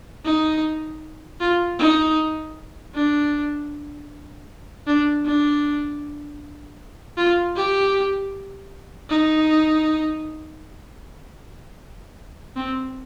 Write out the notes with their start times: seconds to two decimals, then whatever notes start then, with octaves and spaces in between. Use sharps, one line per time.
0.25 D#4
1.41 F4
1.79 D#4
2.95 D4
4.87 D4
5.25 D4
7.17 F4
7.56 G4
9.09 D#4
12.56 C4